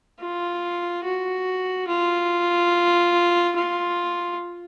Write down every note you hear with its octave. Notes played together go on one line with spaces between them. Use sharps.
F4
F#4
F4
F4